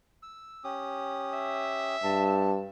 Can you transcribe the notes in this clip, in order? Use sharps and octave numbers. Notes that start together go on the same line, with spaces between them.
E6
C#4 G4 D#6
E5
G2 A5